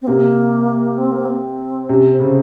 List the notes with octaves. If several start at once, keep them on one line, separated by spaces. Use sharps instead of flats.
C4
C3 A#3
C4
A#3
C4
C3 C#4
C5
C#3